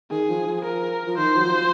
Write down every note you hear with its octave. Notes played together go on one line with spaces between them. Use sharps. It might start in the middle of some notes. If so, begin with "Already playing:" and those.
D#3 G#4
F3
F3
A#4
F3
D#3 C5
F#3
F3